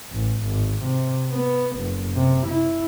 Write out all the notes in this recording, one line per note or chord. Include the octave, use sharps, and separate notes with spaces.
A1
G#1
C3
B3
F#1
C3
E4